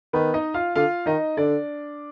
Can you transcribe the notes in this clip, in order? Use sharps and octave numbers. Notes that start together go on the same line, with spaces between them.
D#3 B3 B4
D#4 D#5
F4 F5
D3 F4 F5
D#3 D#4 D#5
D3 D4 D5